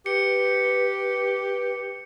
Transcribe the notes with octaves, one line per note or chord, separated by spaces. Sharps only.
G4 B4 C#7